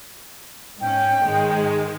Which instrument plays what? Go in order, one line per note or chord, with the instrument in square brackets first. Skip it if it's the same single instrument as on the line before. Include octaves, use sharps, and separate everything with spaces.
[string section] G#2 C#4 [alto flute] G5
[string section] G#2 D#3 G#3